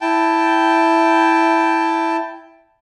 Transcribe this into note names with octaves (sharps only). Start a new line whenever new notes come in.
E4 G5 A5